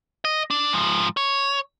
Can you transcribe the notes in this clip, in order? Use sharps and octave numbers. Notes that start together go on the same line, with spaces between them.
D#5
D4
G#2 F3
C#5